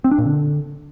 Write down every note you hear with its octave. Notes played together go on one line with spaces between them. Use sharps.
C4
D4
A#2
D3